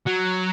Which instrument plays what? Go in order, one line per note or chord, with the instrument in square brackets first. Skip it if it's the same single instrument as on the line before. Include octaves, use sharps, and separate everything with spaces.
[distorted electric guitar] F#3